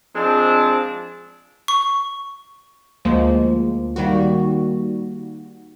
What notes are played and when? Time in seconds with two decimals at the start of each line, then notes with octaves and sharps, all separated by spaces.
0.15 F3 G#3 C4 D4
1.68 C#6
3.05 D2 F3 G#3 A#3
3.96 D#3 G3 A#3 F#4